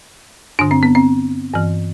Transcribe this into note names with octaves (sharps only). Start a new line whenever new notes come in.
G2 D3 D4
C4
B3
C4
G2 E3